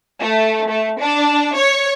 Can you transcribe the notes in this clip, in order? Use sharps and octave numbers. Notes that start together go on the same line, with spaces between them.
A3
A3
D4
C#5